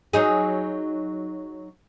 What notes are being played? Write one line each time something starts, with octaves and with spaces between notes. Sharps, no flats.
F#3 D#4 G#4